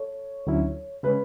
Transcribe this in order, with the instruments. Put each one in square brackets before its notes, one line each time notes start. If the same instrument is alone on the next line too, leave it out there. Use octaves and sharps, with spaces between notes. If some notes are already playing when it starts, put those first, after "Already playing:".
Already playing: [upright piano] A4 C#5
[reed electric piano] D2 D3 F#3 C#4 E4
[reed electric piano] C#3 G#3 C#4 [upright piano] B4